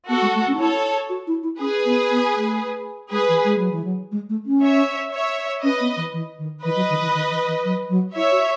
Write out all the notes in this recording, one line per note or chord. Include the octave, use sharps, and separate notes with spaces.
B3 F#4 A4
G#3
A3
C#4
D#4
E4 A4 C#5
F#4
E4
E4
C#4 G#4 B4
B3
B3
A3
G#3 G#4 B4
E3
G#3
F#3
E3
F#3
G#3
A3
C#4
C#5 E5
C#5 E5
C#4 B4 D#5
B3
E3
E3
D#3
E3 B4 D#5
F#3
D#3
E3
D#3
E3
E3
F#3
F#3
E4 C#5 E5
F#4